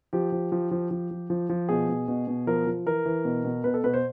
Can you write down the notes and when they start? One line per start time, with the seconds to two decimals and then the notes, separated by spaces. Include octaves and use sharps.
0.13 F3 G4
0.32 F3
0.52 F3
0.71 F3
0.91 F3
1.11 F3
1.30 F3
1.49 F3
1.69 B2 G#4
1.89 B2
2.08 B2
2.27 B2
2.47 F3 A#4
2.67 F3
2.86 E3 A#4
3.05 E3
3.25 B2
3.45 B2
3.64 B2 B4
3.74 A4
3.84 B2 B4
3.94 C5